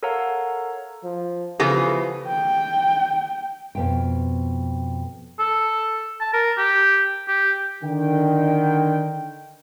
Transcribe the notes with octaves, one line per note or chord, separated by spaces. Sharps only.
A4 A#4 C#5 F5 F#5 A#5
F3
C#3 E3 F3 B3 G4 A4
G5
F2 B2 G5
A4
A5
A#4
G4
G4
D3 D#3 G5